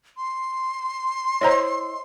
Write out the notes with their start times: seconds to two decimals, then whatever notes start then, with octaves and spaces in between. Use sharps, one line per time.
0.17 C6
1.41 E4 C5 C#5 D#5 A#5